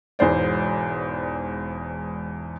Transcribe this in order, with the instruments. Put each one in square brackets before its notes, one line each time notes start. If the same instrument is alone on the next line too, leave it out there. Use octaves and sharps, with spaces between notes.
[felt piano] E1 E2 G#2 C5 D5